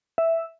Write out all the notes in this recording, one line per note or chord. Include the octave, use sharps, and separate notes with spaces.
E5